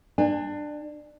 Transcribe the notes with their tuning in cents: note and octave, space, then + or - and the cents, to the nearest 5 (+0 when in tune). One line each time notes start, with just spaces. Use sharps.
D4 +20 G#5 -40